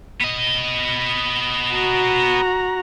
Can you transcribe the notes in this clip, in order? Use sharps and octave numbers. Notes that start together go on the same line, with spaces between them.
B3 D#5
F#4 A#5